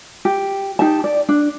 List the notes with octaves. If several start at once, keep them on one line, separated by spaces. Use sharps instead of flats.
G4
D#4 G4 A5
D5
D4